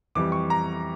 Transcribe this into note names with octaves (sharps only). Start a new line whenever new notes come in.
F2 E3 G3 D6
C#6
A#5